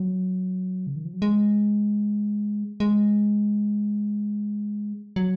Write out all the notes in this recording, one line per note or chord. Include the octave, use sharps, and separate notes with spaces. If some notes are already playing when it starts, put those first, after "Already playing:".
Already playing: F#3
C#3
D#3
F3
F#3
G#3
G#3
F#3